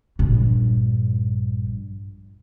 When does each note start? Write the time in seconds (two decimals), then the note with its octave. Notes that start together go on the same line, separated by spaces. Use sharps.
0.19 A#1 G2